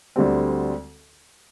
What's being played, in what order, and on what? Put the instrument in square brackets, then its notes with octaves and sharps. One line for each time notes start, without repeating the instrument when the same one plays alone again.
[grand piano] D2 D3 G3 C4